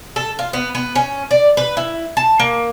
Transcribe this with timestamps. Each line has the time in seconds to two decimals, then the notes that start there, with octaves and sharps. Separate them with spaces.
0.16 A4
0.39 F4
0.53 B3
0.75 B3
0.95 C#4
1.31 D5
1.57 B4
1.77 E4
2.17 A5
2.39 A#3